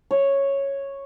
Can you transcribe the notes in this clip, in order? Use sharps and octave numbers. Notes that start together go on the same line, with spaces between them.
C#5